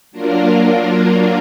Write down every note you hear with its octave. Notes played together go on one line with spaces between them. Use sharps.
F#3 A#3 D4 F4 A#4